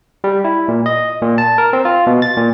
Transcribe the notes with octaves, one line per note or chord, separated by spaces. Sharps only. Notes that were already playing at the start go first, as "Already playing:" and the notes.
G3
E4
A#2
D#5
A#2
A5
A#4
C4
F4
B2
A6
A#2